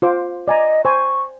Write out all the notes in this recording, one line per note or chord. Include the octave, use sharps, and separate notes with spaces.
F4 C5 D6
D5 D#5 G#5 A#5
C5 G#5 C#6